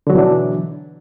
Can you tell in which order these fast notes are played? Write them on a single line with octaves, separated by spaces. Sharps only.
D3 F#3 B2 E3 D4